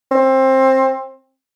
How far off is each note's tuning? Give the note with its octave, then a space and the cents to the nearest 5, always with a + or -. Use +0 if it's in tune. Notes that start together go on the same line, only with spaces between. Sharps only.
C4 +20